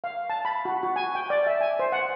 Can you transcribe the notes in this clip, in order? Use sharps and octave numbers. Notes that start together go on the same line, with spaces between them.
F5
A5
B5
F#4
F#4
G#5
G5
D5
E5
G#5
C5
F#5